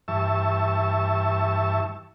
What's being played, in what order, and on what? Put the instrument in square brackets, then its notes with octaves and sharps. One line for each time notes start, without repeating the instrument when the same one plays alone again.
[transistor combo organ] G2 E3 E5 A5 C#6 E6